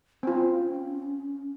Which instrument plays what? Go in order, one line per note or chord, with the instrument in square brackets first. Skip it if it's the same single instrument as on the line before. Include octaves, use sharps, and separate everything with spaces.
[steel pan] C4 F4 [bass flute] C#4